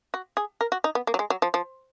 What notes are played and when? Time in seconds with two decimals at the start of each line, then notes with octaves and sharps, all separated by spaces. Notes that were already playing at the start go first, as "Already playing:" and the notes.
0.14 F#4
0.37 G#4
0.61 A#4
0.72 F#4
0.84 D#4
0.95 B3
1.07 A#3
1.14 F#3
1.19 G#3
1.30 F#3
1.42 F3
1.54 F3